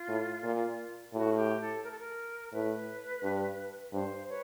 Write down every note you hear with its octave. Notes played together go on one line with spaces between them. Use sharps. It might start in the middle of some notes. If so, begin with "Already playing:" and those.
Already playing: F4
A2
A#2
A2 F#4
G#4
G4
A4
A#4
A4
A#4
A2 B4
G2
G2 C5
B4 C#5